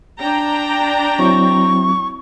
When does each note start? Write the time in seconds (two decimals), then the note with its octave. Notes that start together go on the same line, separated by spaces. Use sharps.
0.18 D4 G5 A#5
1.19 F#3 C4 E4 C#6